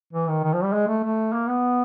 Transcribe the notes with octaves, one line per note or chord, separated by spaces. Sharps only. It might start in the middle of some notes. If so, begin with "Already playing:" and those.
E3
D#3
D#3
F3
G3
G#3
A3
A3
A#3
B3